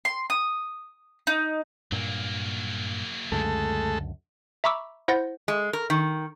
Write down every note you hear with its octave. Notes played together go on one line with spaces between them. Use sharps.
C6
D#6
D#4
G2 A#2 F#3 A#3
C#2 F#2 D3 G#3 A3 A4
E5 A#5 B5 C#6 D6 E6
E4 C5 F#5 G6 A6 A#6
G#3
A#4
D#3